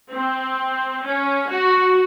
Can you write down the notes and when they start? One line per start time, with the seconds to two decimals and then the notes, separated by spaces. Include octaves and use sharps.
0.13 C4
1.05 C#4
1.50 F#4